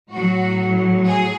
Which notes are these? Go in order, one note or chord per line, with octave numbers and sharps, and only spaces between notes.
A2 F#3 F#4
G#4